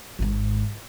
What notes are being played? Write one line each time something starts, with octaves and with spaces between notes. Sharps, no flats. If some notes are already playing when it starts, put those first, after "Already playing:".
G#1 G#2